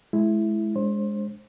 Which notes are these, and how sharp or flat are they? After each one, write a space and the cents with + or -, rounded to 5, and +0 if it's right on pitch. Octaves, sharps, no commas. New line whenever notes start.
G#3 +35 E4 +5
G#3 +0 D4 -20 C5 +25